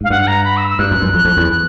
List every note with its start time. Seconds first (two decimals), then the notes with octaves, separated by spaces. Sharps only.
0.01 G#2 F5
0.10 G2 F#5
0.27 A#5
0.45 B5
0.57 E6
0.68 E6
0.79 G2 F#6
0.91 F#2
1.02 F#2
1.14 F2
1.25 F2
1.37 E2